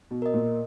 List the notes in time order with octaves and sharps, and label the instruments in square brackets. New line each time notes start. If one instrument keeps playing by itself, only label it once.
[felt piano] B2
[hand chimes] A#4 D#5
[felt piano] A#2